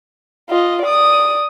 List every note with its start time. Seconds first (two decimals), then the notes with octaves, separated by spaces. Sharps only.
0.49 F4 D#5
0.82 D5 D#6